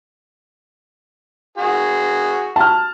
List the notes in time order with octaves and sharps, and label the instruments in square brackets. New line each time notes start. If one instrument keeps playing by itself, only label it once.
[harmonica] F#4 G#4
[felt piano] A5 F6